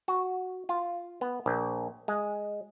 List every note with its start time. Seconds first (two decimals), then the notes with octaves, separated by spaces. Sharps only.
0.08 F#4
0.69 F4
1.21 B3
1.46 A#1
2.08 G#3